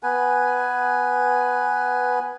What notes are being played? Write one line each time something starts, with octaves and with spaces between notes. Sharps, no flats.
B3 B4 G#5